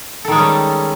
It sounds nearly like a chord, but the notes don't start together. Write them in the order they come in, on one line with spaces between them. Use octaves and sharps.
A4 D#3 G#3 C#4 G3